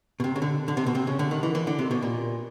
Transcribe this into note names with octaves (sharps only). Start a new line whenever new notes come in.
B2
C3
C#3
D3
D3
C3
B2
C3
C#3
D3
D#3
E3
E3
D3
C3
B2
A#2